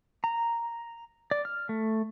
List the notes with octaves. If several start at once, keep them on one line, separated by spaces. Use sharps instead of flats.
A#5
D5
F6
A3